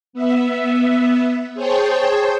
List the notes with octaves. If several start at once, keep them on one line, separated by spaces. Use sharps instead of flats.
B3 E5
G#4 C5 C#5 G5 A5